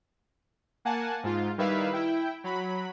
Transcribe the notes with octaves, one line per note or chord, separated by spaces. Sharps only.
A#3 F#5 G#5 A5
G#2 F4
D#3 G3 E4 B4 E5 F5
E4 G5
F#3 B5